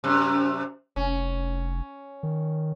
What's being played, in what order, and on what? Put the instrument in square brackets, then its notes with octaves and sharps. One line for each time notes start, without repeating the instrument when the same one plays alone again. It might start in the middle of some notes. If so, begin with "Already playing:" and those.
[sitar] F#2 C3
[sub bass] F1 [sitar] C#4
[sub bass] D#3